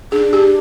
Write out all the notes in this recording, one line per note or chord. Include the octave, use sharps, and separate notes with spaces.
D4 G#4
G4